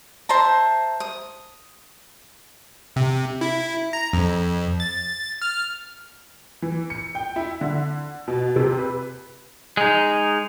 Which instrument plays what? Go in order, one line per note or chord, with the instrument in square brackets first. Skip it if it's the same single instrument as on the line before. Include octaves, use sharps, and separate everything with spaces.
[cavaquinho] C5 E5 A5 A#5
D#6
[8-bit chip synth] C3
E4
A#5
F2
A6
F6
[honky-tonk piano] E3
C#7
G5
E4
D3
B2
C3
B4
[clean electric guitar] G#3 D#4